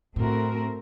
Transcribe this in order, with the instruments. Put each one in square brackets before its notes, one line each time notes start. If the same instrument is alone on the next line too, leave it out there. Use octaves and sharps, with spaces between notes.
[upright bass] A2 [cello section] A3 C4 F#4 A#4